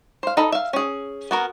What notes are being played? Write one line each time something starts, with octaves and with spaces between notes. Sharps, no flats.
C5 F5
D#4 A4 B5
E5 F5
C#4 G#4
B3 F#4 A#4